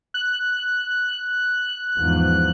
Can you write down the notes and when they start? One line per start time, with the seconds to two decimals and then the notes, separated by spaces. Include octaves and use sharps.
0.14 F#6
1.96 E2 G#2 F3